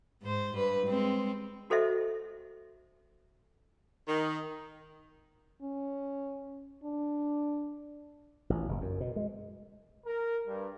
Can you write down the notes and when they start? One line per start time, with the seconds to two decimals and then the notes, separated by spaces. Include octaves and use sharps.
0.22 G#2 C5
0.54 G2 B4
0.87 G#3 C4
1.70 F#4 A4 C5 D#5 E5
4.07 D#3
5.62 C#4
6.84 D4
8.50 A1
8.69 F#1
8.81 F#2
9.00 B2
9.16 G#3
10.05 A#4
10.46 G2